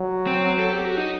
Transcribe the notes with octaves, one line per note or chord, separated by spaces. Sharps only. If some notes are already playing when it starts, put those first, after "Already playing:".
Already playing: F#3
C4
A4
G4
F#4
D#4